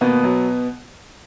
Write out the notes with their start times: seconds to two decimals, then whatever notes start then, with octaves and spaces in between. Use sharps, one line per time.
0.01 D#2 B2 B3
0.24 F#3